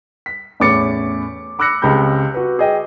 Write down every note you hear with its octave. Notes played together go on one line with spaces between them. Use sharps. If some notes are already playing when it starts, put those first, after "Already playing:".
B6
E2 A2 C#4 D6 A6 C#7
B5 D6 E6 F#6 A#6 C#7
C#2 C4 G4 B5 G6
F#4 B4
G#4 D#5 G5